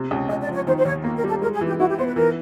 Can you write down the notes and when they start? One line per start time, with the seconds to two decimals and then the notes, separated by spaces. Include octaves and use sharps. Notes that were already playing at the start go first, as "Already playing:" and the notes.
Already playing: C3
0.11 C#2
0.29 C#2 D#5
0.42 D5
0.48 F3
0.54 C#5
0.67 D#3 C5
0.78 C5
0.85 D#2 C#5
1.04 A#3
1.17 A#4
1.24 G3
1.29 A4
1.42 G#3 A#4
1.54 G#4
1.61 E3
1.67 G4
1.79 E4 F#4
1.89 G4
1.98 B3 C5
2.07 B4
2.16 E3 A#4